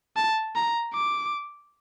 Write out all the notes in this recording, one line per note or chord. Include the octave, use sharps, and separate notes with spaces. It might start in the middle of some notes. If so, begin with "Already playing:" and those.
A5
A#5
D6